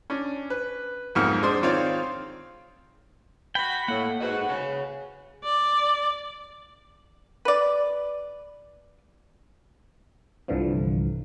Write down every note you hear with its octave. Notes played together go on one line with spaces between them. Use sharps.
C#4 D4
B4
B1 F2 G#2 A#3 F6
G#3 D4 C5 C6
D#3 C4 F4 C#5 D5 F5
F#4 G5 B5
A2 A#3 F#5
F#4 G#4 B4 C5 D#5
G#4 C#5 G#5
D5
B4 D5
C2 G2 D3 E3 F3